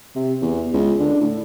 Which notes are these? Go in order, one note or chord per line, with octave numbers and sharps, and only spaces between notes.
C3
E2
C#2
D3
A2